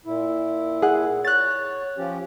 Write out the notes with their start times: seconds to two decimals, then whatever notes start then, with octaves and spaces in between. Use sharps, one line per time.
0.06 A#2 E4
0.82 G#4 F#5
1.25 C#5 F#6 A6
1.98 F3 C#4 G4